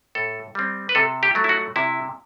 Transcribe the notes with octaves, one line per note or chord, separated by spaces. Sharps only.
A2 A4
G3 C4
B4
C3 A4
G4
F#3 A3
E4
F#4
C3 E4